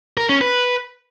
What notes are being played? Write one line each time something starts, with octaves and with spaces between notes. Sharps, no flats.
A#4
C#4
B4